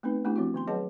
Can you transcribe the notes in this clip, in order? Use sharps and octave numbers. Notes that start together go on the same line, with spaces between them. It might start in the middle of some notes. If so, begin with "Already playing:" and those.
A3 B3 C4 D#4 B4
A3 B3 D4 E4 F4 G4
F3 C4 E4 F#4
D#3 B3 C6
F#3 G#4 B4 D#5 F#5 A5